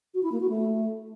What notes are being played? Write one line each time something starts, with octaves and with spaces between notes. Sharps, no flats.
F#4
E4
A#3
F#4
A3